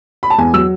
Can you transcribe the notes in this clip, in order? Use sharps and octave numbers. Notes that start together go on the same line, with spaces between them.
B5
A5
E2 G#5
F#3 E6